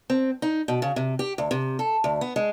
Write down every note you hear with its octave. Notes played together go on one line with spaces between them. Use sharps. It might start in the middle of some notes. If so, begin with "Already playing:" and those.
C4
D#4
B2
C#3
C3
G4
D2
C3
A4
D2
B3
G#3